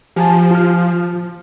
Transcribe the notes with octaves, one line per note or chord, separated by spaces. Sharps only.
F3 G4 G#5 A5
F4 F6